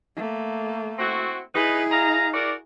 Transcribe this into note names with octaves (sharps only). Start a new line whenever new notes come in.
A3 A#3
C4 E4 F#4
D#4 E4 G#4 B4
D#5 F5 A#5
F#4 A#4 D5